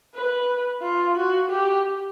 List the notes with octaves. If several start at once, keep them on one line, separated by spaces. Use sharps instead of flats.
B4
F4
F#4
G4